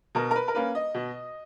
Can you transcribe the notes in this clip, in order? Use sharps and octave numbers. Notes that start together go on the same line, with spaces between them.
B2 A#4
A#4
B4
A#4
A#3 C#4 B4
D#5
B2